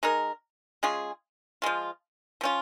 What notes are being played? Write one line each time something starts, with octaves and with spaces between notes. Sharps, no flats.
G#3 D#4 A#4
G#3 C#4 F4 G#4
F3 G#3 F4
F3 C#4 F4